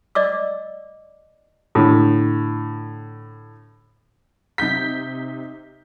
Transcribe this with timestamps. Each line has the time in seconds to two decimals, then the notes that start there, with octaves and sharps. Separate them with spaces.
0.15 D5 D#5 D6 E6
1.75 A2 D3
4.58 C3 D#4 G6 B6